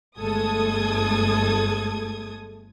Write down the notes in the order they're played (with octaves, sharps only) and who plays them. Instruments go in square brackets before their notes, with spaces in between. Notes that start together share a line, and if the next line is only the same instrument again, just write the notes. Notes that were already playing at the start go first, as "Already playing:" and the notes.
[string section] G1 G#3 A3 A4 D#6 G#6